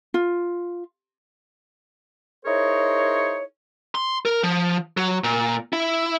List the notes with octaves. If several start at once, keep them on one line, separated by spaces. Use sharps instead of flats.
F4
D#4 E4 G#4 A#4 C5 C#5
C6
A#4
F3
F#3
A#2
E4